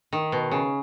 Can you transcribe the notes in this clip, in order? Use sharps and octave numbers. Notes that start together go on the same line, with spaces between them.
D#3
B2
C#3